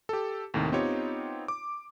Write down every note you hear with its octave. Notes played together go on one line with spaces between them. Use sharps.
G4 A4
D#2 A2 C3 D#3
B3 C4 D#4 F4 G4 C#5
D6